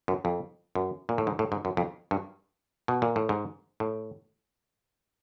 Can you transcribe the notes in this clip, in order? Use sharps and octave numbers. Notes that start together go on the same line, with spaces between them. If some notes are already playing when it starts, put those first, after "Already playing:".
F#2
F2
F#2
A#2
A2
G#2
A2
G#2
F#2
F2
G2
B2
A#2
A2
G#2
A2